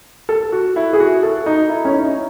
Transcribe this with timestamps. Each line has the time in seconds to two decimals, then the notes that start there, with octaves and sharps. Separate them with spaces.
0.29 A4
0.52 F#4
0.76 E4
0.93 G#4
1.00 F#4
1.23 A4
1.46 D#4
1.69 E4
1.85 C#4
1.93 D#4